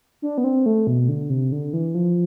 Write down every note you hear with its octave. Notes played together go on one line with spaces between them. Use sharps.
D4
B3
C4
A3
B2
D3
C3
D3
E3
F3